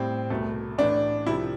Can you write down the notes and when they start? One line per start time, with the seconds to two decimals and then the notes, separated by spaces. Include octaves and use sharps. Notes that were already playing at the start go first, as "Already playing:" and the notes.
Already playing: A2 G3 C4
0.30 C2 B2 A3
0.78 A2 E3 A3 D4
1.26 C2 C3 F3 E4